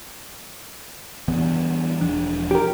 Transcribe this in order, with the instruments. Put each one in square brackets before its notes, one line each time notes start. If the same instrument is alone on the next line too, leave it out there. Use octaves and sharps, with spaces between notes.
[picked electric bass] G2 E3 B3
E1 F3 D4
[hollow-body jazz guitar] G4 A#4